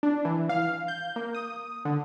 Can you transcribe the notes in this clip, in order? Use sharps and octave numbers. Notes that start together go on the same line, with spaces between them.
D4
E3
F5
G6
A#3
D#6
D3